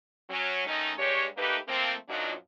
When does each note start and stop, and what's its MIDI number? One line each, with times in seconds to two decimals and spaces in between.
0.29 0.65 54
0.29 0.65 61
0.67 0.92 51
0.67 0.92 57
0.67 0.92 61
0.67 0.92 63
0.98 1.25 43
0.98 1.25 56
0.98 1.25 67
0.98 1.25 73
1.37 1.57 57
1.37 1.57 58
1.37 1.57 63
1.37 1.57 67
1.37 1.57 71
1.68 1.93 53
1.68 1.93 57
1.68 1.93 58
1.68 1.93 60
2.09 2.32 42
2.09 2.32 46
2.09 2.32 53
2.09 2.32 54
2.09 2.32 62
2.09 2.32 63